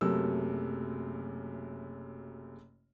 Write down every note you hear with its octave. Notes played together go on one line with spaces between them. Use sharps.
F#1 F#2 C3 A3 A#4 E6